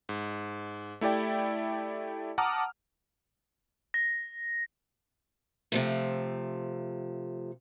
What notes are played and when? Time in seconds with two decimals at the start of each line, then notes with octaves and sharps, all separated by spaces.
0.09 G#2
1.01 A3 E4 G4 D5 G5
2.38 F#5 A5 A#5 D6 D#6 F6
3.94 A#6
5.72 C3 F3 A3